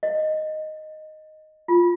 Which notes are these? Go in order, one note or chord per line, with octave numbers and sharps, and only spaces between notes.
D#5
F4